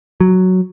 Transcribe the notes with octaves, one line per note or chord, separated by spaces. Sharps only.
F#3